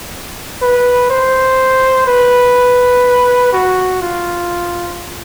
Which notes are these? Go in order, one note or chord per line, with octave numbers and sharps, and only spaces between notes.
B4
C5
B4
F#4
F4